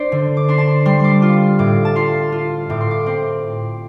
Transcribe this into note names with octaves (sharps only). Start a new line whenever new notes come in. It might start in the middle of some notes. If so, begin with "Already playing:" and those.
Already playing: D4 C5 D5
D3
D6
D4 C6
A5
C6
G3 C6
C6 D6
F4
A2 D6
A5
F4 C6
F4
A2 D6
C6
D6
C4 C6